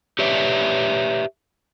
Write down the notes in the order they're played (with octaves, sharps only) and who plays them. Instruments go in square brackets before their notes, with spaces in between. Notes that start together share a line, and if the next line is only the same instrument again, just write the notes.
[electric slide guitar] G4 B4 C#5 D5 E5